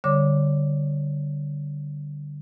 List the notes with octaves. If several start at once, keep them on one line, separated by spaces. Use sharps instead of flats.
D3 G3 C#5 D6